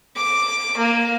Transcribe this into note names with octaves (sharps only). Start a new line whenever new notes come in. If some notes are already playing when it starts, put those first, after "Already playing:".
D6
A#3